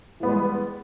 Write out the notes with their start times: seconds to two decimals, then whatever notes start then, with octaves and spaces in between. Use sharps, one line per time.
0.20 E3
0.23 B3
0.26 G3
0.29 G#3